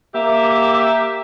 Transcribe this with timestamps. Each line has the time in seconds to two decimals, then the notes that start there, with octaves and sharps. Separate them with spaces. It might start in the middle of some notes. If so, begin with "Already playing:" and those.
0.15 A#3 G4 E5